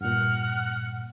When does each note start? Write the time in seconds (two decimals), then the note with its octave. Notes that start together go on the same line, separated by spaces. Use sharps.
0.01 G2 A#2 F#5 F6